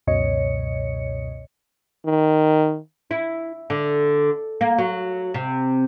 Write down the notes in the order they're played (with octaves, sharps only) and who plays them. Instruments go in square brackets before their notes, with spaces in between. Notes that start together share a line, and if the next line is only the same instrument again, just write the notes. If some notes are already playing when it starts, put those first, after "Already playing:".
[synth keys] C#2 F#2 B2 C#5 D#5 C#7
[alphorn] D#3
[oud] E4
D3
A#3
F#3
C3